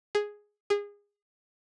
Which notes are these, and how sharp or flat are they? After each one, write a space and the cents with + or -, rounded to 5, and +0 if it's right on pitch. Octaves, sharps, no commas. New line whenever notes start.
G#4 +0
G#4 -25